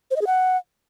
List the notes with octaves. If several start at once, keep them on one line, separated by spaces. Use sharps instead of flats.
C5
D#5
G#4
F#5